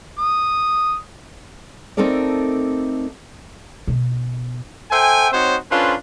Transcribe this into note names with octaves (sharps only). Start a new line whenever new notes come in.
D#6
A3 C4 D#4 A4 A#4 D5
B2
A4 C5 E5 G5 G#5
C4 D#4 F#4 C5 C#5
C#4 D4 F4 A4 B4 C5